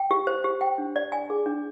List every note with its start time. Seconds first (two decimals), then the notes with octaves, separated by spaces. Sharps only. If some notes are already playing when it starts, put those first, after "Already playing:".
Already playing: G5
0.11 G4
0.27 C5
0.44 G4
0.61 G5
0.78 D4
0.96 D5
1.12 G#5
1.30 G#4
1.46 D4